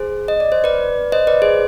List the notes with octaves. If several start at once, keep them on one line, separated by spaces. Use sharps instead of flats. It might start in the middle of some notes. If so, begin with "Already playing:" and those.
Already playing: G#4 C5
D#5
D5
C5
B4 D5
C5 D#5
B4 D5
G#4 C5